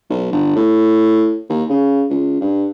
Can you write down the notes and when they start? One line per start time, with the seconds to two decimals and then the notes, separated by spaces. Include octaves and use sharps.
0.10 B1
0.32 G1
0.56 A2
1.49 D#2
1.70 C#3
2.10 C#2
2.41 G2